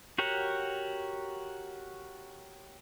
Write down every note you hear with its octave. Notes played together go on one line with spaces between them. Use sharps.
F#4 G4 A#4 C#5 F#5